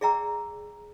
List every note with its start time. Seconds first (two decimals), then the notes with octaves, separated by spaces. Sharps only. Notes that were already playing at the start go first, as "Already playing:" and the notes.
0.01 G#4 D5 E5 G5 A#5 E6